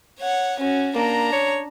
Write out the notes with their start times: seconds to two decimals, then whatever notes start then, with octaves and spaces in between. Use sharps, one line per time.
0.19 C#5 F#5
0.59 C#4 F#4
0.95 A#3 D4 A#5
1.33 C#5